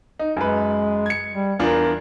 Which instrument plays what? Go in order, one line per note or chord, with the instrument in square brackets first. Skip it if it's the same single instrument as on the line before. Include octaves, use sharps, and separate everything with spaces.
[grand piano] D#4
[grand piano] F#2 B4 [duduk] G#3
[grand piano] G#6 C#7
[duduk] G3
[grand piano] E2 D4 F4 [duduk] A#4